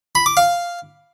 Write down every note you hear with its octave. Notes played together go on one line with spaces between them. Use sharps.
B5
D6
F5